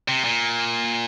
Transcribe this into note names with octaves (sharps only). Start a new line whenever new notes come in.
C3
A#2